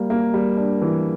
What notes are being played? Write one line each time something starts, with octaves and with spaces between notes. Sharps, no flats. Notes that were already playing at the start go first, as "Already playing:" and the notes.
Already playing: G3 A#3
A#3
G3
D4
E3